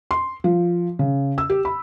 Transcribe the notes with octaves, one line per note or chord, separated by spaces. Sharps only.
C6
F3
C#3
E6
G4
B5